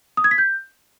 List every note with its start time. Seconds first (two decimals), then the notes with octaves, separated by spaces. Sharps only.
0.17 D#6
0.24 G#6
0.31 B6
0.38 G6